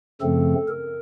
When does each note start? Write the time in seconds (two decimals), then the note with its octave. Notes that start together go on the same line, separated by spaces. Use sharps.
0.21 F#2 C#3 F3 A3 C4 A4
0.69 A#4